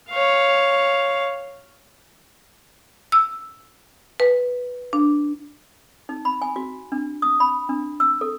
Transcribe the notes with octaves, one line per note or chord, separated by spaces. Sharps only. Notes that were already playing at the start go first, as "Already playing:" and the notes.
C#5 F5
E6
B4
D4
D#4
B5
G#5
F#4
D4
D#6
B5
D4
E6
A4